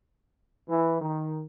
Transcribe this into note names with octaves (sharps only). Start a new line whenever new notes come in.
E3
D#3